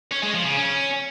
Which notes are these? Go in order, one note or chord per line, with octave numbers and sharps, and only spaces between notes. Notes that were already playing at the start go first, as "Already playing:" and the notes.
C#4
G#3
F3
C#3
C#4